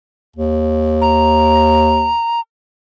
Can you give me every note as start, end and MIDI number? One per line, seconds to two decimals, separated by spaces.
0.36 2.16 39
1.01 2.40 82